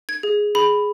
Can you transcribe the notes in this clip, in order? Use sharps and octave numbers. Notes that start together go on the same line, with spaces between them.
G#6
G#4
G#4 B5